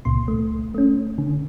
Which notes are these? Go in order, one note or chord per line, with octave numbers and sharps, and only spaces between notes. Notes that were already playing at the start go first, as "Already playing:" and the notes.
C#2 A#2 C6
A3
A3 C#4
D3